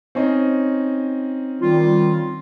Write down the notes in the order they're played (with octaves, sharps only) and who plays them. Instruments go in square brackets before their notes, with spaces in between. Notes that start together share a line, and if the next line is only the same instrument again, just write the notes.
[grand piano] C4 C#4 D#4
[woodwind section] D#3 G3 F4